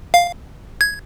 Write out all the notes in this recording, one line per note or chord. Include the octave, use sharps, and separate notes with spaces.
F5
G#6